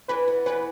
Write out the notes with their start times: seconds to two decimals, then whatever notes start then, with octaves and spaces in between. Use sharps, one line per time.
0.08 E3 B4
0.28 B3
0.46 E3 B4